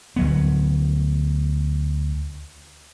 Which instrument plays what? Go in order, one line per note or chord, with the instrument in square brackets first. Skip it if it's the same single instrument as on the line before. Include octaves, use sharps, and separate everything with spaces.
[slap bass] D2 F#3 B3